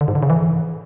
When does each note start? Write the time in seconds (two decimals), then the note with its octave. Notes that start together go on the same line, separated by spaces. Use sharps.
0.01 D3
0.08 G#2
0.15 D3
0.23 C#3
0.30 E3